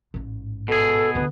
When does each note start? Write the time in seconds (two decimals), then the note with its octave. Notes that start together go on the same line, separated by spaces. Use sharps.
0.14 A1 G#2
0.68 B2 G#4 A4
1.15 D2 D3 B3